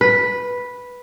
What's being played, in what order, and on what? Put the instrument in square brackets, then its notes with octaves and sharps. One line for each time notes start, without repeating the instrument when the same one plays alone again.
[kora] B4